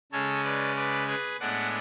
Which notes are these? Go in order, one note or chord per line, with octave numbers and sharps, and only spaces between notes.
C#3 G#3 C#4 A4 C#5
B4 D5
B4 D5
G#4 B4
A2 G#3 B3 D4 D5 F#5